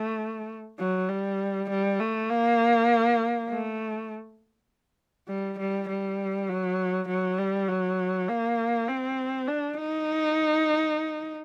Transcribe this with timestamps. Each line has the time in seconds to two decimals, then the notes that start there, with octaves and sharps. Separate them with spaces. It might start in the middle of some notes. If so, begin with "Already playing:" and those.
Already playing: A3
0.79 F#3
1.09 G3
1.70 G3
2.00 A3
2.29 A#3
3.50 A3
5.28 G3
5.59 G3
5.89 G3
6.49 F#3
7.08 F#3
7.39 G3
7.69 F#3
8.28 A#3
8.89 C4
9.48 D4
9.78 D#4